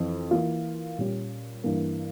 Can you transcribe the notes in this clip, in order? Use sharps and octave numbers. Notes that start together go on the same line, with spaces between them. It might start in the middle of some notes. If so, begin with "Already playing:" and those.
Already playing: F2 E3 C4
E3 A#3 F4
A#2 G3 C#4 G4
G2 E3 A#3